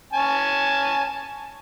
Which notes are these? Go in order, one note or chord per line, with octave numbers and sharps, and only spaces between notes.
C#4 G#5 A5